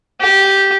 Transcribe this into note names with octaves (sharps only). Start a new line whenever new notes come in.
G4